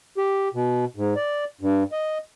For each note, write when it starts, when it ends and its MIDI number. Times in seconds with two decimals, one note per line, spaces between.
0.18 0.49 67
0.54 0.85 47
0.96 1.14 44
1.16 1.45 74
1.61 1.83 43
1.92 2.18 75